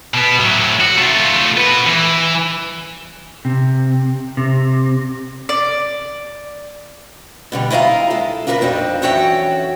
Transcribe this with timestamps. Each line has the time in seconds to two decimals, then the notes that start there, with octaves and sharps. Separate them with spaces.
0.14 B2 B3
0.40 A2 F#3
0.81 F#4
0.98 A3 F4
1.57 F#4 B4
1.87 E3
3.45 C3
4.37 C3
5.49 D5
7.52 B2 D3 G3
7.70 E4 F4 D#5 F5 A#5
8.10 G#3 A4
8.47 D4 F4 F#4 A#4 B4
8.61 F2 C4 D4 D#4
9.02 F#2 E3 F#4 A4 C#5 G5